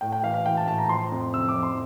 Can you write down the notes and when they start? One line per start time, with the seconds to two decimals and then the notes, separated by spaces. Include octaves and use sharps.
0.01 A2 G5
0.12 G5
0.23 E3 F5
0.34 F5
0.46 E3 G5
0.57 A5
0.67 A2 A5
0.78 A#5
0.89 F3 C6
1.12 F2
1.34 C3 E6
1.48 D6
1.56 F2
1.63 C6